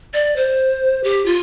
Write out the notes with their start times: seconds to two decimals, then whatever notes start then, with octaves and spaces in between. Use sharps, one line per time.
0.13 D5
0.36 C5
1.04 G4
1.25 F4